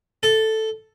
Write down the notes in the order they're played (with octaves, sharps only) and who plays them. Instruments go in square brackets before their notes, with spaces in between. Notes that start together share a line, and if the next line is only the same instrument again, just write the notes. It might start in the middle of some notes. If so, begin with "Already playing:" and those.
[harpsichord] A4